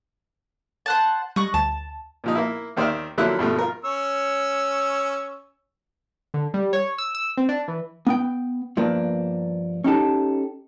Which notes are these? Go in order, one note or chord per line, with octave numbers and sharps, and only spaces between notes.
C5 F#5 A5
G3 D#5 C#6 F#6
D2 A5
A#2 F3 D#4
A#3 E4
D#2 D#3 C5 D5 E5 F6
D3 F3 F#3 A#3 E4 F#6
G2 B2 F3 A3
F4 A#4
C#4 C#5 E6
D3
G3
C#5
E6
E6
C4
D4
E3
B3 G5
G2 F3 A#3 B3 D4
C#4 D#4 G4 A4